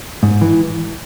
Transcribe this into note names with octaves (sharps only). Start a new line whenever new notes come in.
G#2
E3